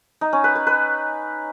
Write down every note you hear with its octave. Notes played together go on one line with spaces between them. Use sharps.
D#4
C#4
B4
B4
B4